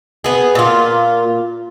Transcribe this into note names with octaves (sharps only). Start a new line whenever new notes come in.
B3 G#4
A#2 F4